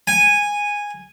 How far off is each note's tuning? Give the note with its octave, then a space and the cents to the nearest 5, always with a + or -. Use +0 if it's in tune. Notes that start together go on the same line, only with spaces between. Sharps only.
G#5 -10